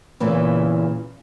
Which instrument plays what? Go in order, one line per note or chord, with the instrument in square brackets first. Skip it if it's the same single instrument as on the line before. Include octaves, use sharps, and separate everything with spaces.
[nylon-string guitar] E2 A#2 C#3 E3